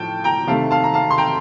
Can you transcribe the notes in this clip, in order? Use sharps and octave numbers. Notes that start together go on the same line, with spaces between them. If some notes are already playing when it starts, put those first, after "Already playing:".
Already playing: A2 F3 G5 A5
G5 A#5
C3 D#3 A3 F5 A5
F5 A5
A#5
F5 A5
C6
G5 A#5